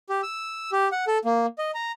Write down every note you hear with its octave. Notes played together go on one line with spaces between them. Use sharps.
G4
E6
G4
F#5
A4
A#3
D#5
A#5